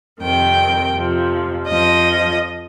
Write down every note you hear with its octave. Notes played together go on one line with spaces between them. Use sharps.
F2 C3 D#3 G5
F2 C3 F3
F2 F3 D#5